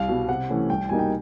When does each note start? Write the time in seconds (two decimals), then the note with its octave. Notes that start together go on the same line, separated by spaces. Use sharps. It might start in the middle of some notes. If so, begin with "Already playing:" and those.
Already playing: C2 F5
0.09 B2 G3
0.28 C3 F#5
0.49 E3 A3 C#4
0.70 C2 G5
0.89 B2 G3 A#3 D#4 G#5
0.99 G5